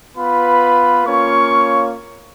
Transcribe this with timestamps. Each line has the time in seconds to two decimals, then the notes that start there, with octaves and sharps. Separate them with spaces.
0.16 B3 F4 B4 B5
1.05 A#3 C#4 F4 C#5 C#6